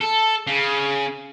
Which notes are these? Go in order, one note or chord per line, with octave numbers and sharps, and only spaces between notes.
A4
C#3